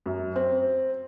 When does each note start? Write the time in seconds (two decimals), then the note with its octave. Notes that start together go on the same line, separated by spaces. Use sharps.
0.06 F#2
0.36 C4